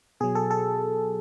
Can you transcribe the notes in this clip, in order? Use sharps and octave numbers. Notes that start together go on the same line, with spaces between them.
B2 F#3 G#4
A4
A4